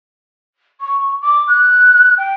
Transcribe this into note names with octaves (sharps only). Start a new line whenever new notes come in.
C#6
D6
F#6
G5